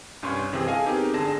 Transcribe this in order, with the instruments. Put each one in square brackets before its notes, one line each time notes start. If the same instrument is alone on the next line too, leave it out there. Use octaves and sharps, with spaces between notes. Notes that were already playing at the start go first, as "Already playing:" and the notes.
[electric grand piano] C2 G2 C#4 C#5 C6
G1 C3 E3 C4 G#4
G#4 A4 D#5 F5 G#5
B3 C4 D#4 G4 G#4 A#4
G#1 D3 G#4 A5 A#6 E7